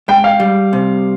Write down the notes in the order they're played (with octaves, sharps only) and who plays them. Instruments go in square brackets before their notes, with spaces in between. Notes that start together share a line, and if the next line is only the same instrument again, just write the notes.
[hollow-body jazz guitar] G#3 [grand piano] G5
[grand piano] F5
[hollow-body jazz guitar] G3
C3